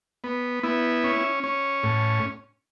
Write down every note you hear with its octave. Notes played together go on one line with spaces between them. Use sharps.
B3
B3 E4
C#4
C#4
A2